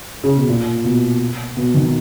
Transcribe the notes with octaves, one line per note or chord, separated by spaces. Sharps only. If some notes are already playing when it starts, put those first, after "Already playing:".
C#3
B2
A#2
B2
B2
D#3